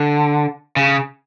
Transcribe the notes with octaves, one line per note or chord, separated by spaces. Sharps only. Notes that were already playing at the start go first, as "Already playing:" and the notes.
Already playing: D3
C#3